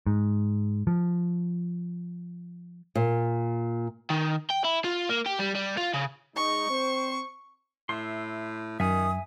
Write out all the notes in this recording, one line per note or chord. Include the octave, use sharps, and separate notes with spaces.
G#2
F3
A#2
D#3
G5
E4
F4
A#3
G4
G3
G3
F4
C#3
G#3 D#4 C#6
C4 C5
A2 E5 C6
F#2 D#3 E5 G#5 D#6